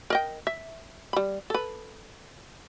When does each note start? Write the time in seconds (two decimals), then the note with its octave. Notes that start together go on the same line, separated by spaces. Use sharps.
0.10 A#4 D#5 G5
0.47 E5
1.13 G3 B5
1.50 A4 B4